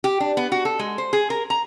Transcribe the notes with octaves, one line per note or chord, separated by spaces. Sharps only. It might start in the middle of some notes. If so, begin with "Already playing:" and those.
G4
D4
B3
F#4
A4
G#3
C5
G#4
A#4
A#5